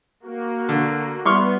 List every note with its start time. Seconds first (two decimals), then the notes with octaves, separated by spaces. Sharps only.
0.24 A#3 F#4
0.69 D3
1.25 G3 B3 E4 B4 C6 C#6 F6